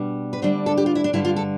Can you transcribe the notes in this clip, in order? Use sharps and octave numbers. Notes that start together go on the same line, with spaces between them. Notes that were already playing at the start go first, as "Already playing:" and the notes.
Already playing: B2 G3 D4
B4
D2 D3 G3 D4 C5
A4
G4
F4
E4
D4
G2 D3 G3 E4
F4
A4